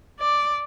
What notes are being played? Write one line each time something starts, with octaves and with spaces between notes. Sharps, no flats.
D5